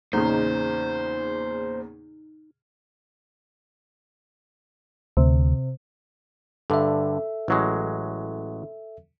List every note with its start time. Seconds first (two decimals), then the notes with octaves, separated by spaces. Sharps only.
0.13 E2 A#2 C#3 D#4 C5
5.17 D2 C3
6.70 G2 D3 A4 E5
7.48 A1 F#3 G#3